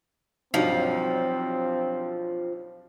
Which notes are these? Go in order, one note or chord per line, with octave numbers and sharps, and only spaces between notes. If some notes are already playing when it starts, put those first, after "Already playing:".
B1 G2 F3 C4